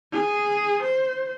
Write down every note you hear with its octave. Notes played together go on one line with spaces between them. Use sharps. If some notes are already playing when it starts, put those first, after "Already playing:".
G#4
C5